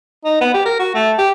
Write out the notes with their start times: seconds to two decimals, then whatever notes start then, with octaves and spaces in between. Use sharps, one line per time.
0.25 D#4
0.41 B3
0.54 G4
0.65 A#4
0.79 F#4
0.95 A3
1.18 G4